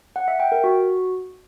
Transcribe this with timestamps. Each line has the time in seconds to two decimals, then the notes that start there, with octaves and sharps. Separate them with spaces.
0.16 F#5
0.28 E5
0.40 G5
0.52 A#4
0.64 F#4